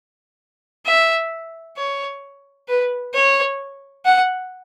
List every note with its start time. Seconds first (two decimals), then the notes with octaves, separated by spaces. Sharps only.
0.86 E5
1.77 C#5
2.68 B4
3.14 C#5
4.05 F#5